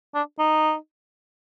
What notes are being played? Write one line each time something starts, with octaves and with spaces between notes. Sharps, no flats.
D4
D#4